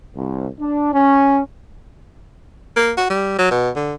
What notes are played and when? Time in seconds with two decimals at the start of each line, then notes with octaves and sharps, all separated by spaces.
0.15 C2
0.60 D4
0.93 C#4
2.76 A#3
2.97 F#4
3.10 G3
3.38 F#3
3.51 B2
3.75 D3